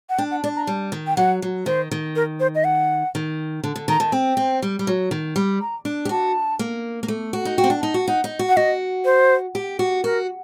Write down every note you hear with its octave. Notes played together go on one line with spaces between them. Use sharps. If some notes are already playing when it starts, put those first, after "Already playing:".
F#5
D4 G5
F#5
D4 D5
A#5
G3
D#3
G5
F#3 F#5
F#3
D#3 C5
D#3
A#4
C5
D#5
F#5
D#3
D3
D3
D#3 A#5
D#3 A5
C4 G5
C4
G3
G3
F#3
D#3
G3
A#5
D4
G4
F#4 A5
A#3
A#3
A3
F#4
D#4
F#4 G5
C4
D4
D#4
F#4
D#4 F#5
D#4
F#4
F#5
F#4 D#5
C5
G4
F#4
F#4 A#4